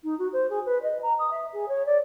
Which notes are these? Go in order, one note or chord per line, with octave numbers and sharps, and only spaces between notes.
D#4
F#4
C5
G#4
B4
D#5
A#5
D#6
E5
G#4
C#5
D5